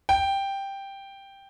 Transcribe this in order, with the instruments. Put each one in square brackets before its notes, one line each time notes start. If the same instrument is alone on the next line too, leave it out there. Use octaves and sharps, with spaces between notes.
[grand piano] G5